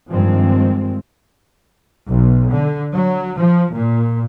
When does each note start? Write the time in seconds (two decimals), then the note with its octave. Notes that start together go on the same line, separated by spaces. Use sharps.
0.11 G2 D#3 F3 G#3 C4
2.09 B1
2.52 D3
2.95 F#3
3.40 F3
3.74 A#2